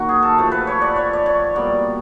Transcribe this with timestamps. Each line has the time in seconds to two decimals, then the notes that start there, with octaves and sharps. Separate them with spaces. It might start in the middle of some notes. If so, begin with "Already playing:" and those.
Already playing: D#3 F#3 A#3 F#4
0.09 G#4
0.23 A4
0.38 C3 F3 A3
0.52 B4
0.67 C#5
0.82 D5
0.96 C#5
1.13 D5
1.26 C#5
1.55 B2 G3 A#3 D5